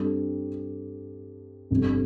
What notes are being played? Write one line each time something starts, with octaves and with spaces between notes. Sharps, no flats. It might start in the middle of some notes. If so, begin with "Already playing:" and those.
Already playing: G2 G3 C4 A4
G1 F2 C3 G3